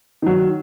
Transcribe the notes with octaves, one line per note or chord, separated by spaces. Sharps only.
D#3 F#3